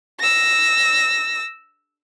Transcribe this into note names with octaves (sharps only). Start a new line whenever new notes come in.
E6 A#6